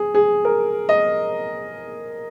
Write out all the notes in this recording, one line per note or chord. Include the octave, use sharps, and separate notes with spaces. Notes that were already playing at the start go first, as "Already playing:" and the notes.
Already playing: G#4
G#4
A#4
D#5